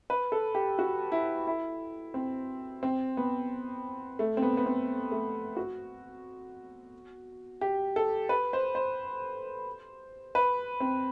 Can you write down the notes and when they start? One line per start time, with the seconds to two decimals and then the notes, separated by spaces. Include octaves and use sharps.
0.10 B4
0.32 A4
0.55 G4
0.79 F#4
1.12 E4
1.47 E4
2.14 C4
2.83 C4
3.17 B3
4.19 A3
4.37 C4
4.42 B3
4.57 B3
4.66 C4
5.11 A3
5.57 F#4
7.61 G4
7.96 A4
8.29 B4
8.53 C5
8.75 C5
10.35 B4
10.80 C4